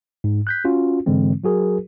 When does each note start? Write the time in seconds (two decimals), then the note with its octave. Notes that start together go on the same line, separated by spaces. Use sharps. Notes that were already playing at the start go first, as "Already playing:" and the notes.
0.24 G#2
0.47 F#6 G6 B6
0.65 C#4 F4 F#4
1.06 G#2 D3 E3 G#3 C4
1.44 F#3 F#4 G#4 A#4